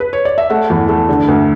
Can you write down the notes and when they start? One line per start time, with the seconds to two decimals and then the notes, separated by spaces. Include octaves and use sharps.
0.00 B4
0.13 C#5
0.25 D5
0.38 E5
0.50 A3 F#5
0.70 E2
0.89 A3
1.09 D3
1.28 D2